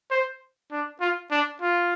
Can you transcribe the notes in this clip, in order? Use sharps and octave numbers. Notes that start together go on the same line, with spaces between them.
C5
D4
F4
D4
F4